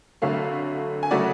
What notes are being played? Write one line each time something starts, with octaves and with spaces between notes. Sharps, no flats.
F2 D3 F#3 A3 C#5 F5
G#5
C#3 F#3 A3 D5 F#5